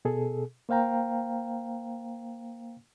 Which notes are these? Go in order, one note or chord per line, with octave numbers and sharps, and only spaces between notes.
B2 G#4 A4
A#3 C5 F5 G5 A#5